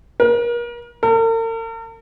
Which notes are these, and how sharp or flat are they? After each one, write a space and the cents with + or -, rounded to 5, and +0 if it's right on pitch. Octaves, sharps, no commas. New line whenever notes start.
A#4 +35
A#4 -45